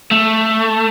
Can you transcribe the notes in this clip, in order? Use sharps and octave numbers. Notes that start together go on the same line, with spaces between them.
A3